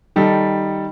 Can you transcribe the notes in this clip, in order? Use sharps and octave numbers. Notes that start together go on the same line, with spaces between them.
D#3 G3 D#4 A4